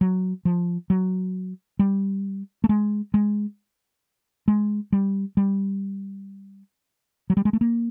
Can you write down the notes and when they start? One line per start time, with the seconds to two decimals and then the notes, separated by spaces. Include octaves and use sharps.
0.01 F#3
0.45 F3
0.90 F#3
1.79 G3
2.64 A3
2.69 G#3
3.14 G#3
4.48 G#3
4.92 G3
5.37 G3
7.30 F#3
7.37 G3
7.45 G#3
7.53 A3
7.61 A#3